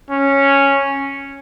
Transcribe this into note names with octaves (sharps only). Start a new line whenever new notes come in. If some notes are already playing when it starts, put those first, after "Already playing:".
C#4